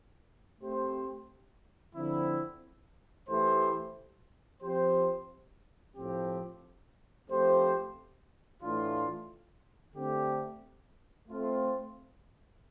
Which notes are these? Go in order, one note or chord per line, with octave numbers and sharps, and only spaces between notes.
A3 C4 G4 C5
D3 F3 C4 E4
E3 A3 E4 G4 C5
F3 C4 G4 C5
A2 F3 C4 G4
F3 A3 C4 G4 C5
A2 E3 A3 D4 F4
D3 A3 C4 G4
A3 C4 F4